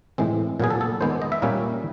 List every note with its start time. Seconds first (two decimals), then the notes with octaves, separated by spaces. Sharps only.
0.18 A2 E3 G#3 C4
0.60 A#2 F#3 B3 G#4
0.70 A4
0.81 A4
1.01 D#3 G#3 B3 C5
1.11 D5
1.22 D#5
1.32 E5
1.42 A#2 G3 A#3 C#4